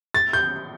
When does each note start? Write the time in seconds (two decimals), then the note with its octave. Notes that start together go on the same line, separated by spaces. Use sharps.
0.14 A6
0.33 G6